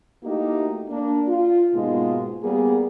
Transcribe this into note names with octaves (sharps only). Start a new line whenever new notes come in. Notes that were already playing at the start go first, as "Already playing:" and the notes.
A3 A#3 D#4 E4 F#4 G4
A#3 D4
F4
G#2 B2 G#3 A#3 D#4 F4
G3 A#3 B3 G#4